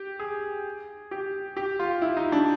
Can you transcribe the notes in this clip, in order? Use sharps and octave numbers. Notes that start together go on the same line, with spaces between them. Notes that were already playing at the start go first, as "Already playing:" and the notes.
Already playing: G4
G#4
G4
G4
F4
E4
D#4
D4